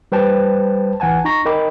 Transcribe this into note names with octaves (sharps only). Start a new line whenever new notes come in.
G3 B4 C5 G5 A5
A1 E3 F#5 G#5 A5
D#4 A#5 C#6 A#6
D#4 A#4 D#5 G5 B5 D6